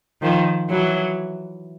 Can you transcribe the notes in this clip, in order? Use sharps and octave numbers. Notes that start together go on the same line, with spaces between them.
D#3 F3
E3 F#3